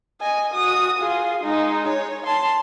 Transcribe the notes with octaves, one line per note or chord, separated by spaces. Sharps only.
D#5 G#5
F#4 D#6
F4 G#4
G#3 D#4
C#5
A5 C6